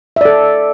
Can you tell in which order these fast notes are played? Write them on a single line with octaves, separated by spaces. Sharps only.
E5 D5 A4